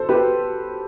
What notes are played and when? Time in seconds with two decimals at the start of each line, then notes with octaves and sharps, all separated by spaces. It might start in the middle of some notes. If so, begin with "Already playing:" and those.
Already playing: A4 C5
0.09 G4 B4